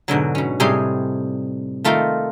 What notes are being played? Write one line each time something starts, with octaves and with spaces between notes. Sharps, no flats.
G#2 B2 D3 F#3
B2 C#4
A2 C3 G3 D#4 G#4 C6
D#3 A3 F4 A4 A#4 C5